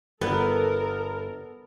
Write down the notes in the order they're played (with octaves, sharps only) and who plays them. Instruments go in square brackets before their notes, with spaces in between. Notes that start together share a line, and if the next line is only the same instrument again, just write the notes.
[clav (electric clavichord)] G1 [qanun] B3 [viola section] A4 A#4